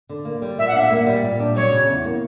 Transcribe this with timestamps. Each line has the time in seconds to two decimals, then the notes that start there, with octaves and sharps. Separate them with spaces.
0.09 D3
0.25 A#3
0.42 G3
0.58 A#2 E5
0.67 F#5
0.73 D4 E5
0.90 A#3
1.07 G3
1.22 A#2
1.40 D4
1.55 F#3 C#5
1.71 C#3
1.87 E2
2.04 A#3